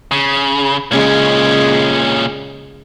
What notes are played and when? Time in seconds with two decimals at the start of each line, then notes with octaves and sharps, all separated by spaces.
0.11 C#3
0.91 A#2 C#3 G#3 C#4